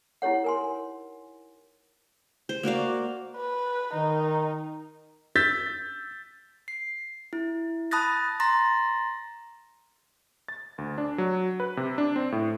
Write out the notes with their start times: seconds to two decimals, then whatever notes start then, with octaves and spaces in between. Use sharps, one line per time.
0.22 D#4 E4 G4 C#5 F#5
0.44 A#4 G#5 C6
2.49 C5
2.63 A#3 F#4 D5 F5
3.37 B4
3.94 D#3 D#4
5.36 E6 G6 A6 B6
6.68 C7
7.33 E4
7.91 A5 B5 D#6 F#6 A6 A#6
8.40 A#5 C6 A6 A#6
10.48 A6
10.78 D2
10.98 D4
11.18 F#3
11.60 B4
11.77 C3
11.98 D4
12.16 C4
12.32 A2